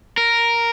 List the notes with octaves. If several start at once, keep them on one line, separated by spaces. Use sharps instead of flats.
A#4